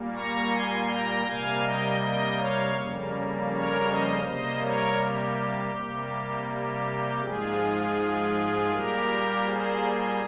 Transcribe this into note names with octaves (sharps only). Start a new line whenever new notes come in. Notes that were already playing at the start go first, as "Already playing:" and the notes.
Already playing: A#2 G3 A#3
A#5 C#6
G#5 C6
G5 A#5
C3 G3 A#3 F5 G#5
D#5 G5
D#5 G5
C#5 F5
F2 C#3 G3 A#3
A#4 C#5
C5 D#5
C3 G3 A#3 C5 D#5
A#4 C#5
G4
C3 G3 A#3
G4
G#2 F3 G#3 F4 G#4
A#2 G3 A#3 G4 A#4
G#4 C5